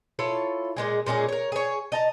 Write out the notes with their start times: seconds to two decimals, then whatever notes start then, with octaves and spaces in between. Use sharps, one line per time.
0.19 E4 F4 A4 C#5
0.76 A#2 G#3 G#4
1.06 A#2 G#3 C#4 G#4
1.28 A#4 C#5
1.52 G#4 C#5
1.92 D#5 A5 A#5